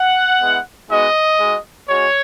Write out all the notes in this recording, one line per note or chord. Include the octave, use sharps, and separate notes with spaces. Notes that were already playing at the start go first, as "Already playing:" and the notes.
Already playing: F#5
G#3 B3 E4
G#3 B3 D#4 F#4 D#5
G#3 D#4 F#4
G#3 C#4 F#4 C#5